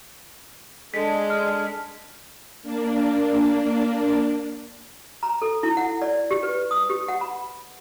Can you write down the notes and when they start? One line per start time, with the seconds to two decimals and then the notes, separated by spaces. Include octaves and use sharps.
0.94 G#3 D4 G#4 A4 B6
1.30 F6
2.62 A#3 D4
5.23 A#5
5.42 A4
5.63 E4
5.77 F#5
6.02 D5
6.31 G4
6.43 B4
6.71 D#6
6.90 G4
7.08 F#5
7.21 B5